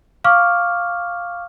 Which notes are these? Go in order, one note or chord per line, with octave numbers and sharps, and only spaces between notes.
F5 C#6 D6 F6